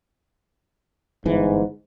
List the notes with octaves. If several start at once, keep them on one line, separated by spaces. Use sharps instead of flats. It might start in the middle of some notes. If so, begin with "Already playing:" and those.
G1 G#2 E3